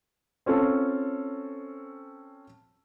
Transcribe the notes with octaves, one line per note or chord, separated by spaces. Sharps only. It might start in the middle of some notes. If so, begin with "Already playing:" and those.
C4 C#4 F4 A4